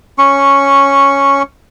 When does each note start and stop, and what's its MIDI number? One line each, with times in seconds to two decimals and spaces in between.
0.18 1.42 61
0.18 1.42 85